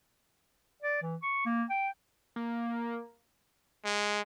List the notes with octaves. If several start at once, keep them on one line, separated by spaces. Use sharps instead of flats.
D5
E3
C#6
A#3
G5
A#3
G#3